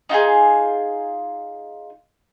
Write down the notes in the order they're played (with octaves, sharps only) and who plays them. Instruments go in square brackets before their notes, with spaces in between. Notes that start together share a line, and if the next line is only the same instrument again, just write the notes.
[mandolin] D#4 F4 F#4 G#4